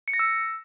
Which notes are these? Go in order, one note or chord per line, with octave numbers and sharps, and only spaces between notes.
C#7
A#6
E6